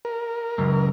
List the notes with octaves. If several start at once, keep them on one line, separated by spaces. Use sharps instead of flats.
A#4
C#2 F#2